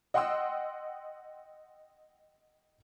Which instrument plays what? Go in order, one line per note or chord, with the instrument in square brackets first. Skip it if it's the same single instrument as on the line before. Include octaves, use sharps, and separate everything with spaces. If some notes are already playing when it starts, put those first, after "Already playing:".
[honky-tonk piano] D#5 F#5 G5 C6 D#6 E6